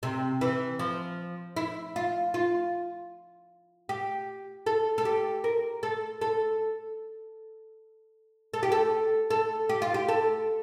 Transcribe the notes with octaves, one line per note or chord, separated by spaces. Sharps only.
C3
E3
F3
E4
F4
F4
G4
A4
A4
G4
A#4
A4
A4
A4
G4
A4
A4
G4
F4
G4
A4